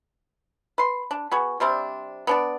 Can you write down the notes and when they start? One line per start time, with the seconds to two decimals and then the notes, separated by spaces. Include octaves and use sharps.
0.78 B4 C6
1.11 D4
1.31 B3 F#4 G#4
1.60 C3 G3 C4 D4
2.27 B3 D4 D5